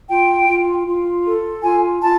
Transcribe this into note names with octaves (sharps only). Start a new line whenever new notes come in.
F4 G5
F4
F4
A4
F4 G#5
F4 A5